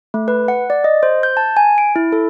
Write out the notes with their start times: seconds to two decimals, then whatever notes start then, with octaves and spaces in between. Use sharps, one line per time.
0.14 A3
0.28 B4
0.48 F#5
0.70 D5
0.84 D#5
1.03 C5
1.23 G6
1.37 A5
1.57 G#5
1.78 D7
1.96 E4
2.12 A4